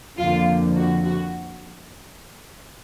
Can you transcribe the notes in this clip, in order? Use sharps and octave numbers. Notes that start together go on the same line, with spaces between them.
F2 D3 F3 A#3 F4
F#4
F#4